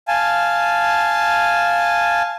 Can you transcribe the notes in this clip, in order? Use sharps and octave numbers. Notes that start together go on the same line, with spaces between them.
F5 G#5 A5